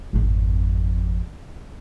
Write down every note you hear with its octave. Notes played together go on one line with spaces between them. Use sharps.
G#1 F2